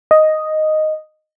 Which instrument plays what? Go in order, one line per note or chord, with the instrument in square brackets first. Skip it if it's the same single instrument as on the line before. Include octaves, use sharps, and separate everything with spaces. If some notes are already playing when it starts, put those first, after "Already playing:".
[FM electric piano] D#5